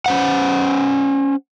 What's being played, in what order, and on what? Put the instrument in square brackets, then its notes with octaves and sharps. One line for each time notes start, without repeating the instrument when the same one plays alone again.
[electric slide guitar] C#4 C5 F#5